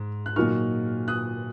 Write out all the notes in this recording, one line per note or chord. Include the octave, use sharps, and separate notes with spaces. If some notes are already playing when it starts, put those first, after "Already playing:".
Already playing: G#2
F#6
A#2 F#3 A#3 D#4 C#6 F6
D#6 F#6